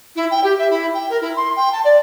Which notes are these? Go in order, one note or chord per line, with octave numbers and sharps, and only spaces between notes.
E4
G5
G4
E5
E4
G5
A#4
E4
C6
G5
A5
D5